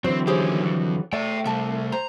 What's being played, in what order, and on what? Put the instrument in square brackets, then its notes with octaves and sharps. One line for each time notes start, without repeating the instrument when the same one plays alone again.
[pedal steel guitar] D3 E3 F#3 [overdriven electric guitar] C4 [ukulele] C5
[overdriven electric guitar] D#2 C#4 [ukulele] G4 G#4 C5
[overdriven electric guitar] F2
[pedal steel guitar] A3 [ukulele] D5 [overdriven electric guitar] E5 G5
[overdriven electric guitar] C3 G3 [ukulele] E5 A5
[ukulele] C5 [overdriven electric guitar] A#5